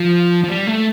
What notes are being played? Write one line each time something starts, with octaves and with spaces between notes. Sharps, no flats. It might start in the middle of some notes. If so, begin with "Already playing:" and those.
Already playing: F3
F3
G3
A3